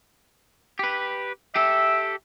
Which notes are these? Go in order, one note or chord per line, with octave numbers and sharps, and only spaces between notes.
G4 B4
G4 A4 E5